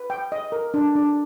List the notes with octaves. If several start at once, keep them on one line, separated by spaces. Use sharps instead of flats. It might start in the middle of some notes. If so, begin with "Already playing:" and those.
Already playing: B4
G5
D#5
A#4
D4
D4